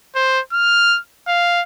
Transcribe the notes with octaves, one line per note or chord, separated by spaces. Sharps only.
C5
F6
F5